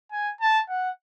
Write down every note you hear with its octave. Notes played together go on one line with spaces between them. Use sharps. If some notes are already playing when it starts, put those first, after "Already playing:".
G#5
A5
F#5